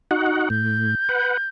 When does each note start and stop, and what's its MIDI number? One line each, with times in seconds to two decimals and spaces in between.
0.11 0.49 63
0.11 0.49 66
0.11 0.49 78
0.50 0.95 45
0.50 1.49 91
1.09 1.37 71
1.09 1.37 78